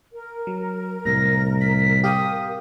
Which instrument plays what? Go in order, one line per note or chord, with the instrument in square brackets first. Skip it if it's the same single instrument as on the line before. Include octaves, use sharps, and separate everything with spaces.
[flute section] A#4
[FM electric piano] F#3
[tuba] C2 [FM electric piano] A2 [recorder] A#6
[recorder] B6
[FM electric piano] G4 F5 G5 [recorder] D#6